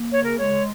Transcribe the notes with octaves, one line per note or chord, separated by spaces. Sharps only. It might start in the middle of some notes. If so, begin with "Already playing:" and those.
Already playing: A#3
C#3 C#5
A#4
G#3 C#5